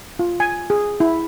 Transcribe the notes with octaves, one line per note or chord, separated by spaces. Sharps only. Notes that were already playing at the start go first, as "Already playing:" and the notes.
F4
G#5
G#4
E4